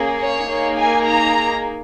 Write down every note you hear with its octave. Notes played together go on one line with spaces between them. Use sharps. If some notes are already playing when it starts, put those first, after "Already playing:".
Already playing: A#3 C#4 G#4
C#5
A#3 D#4 G#4
G#5
A#5